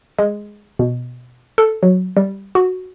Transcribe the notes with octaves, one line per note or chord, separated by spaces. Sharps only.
G#3
B2
A4
F#3
G3
F#4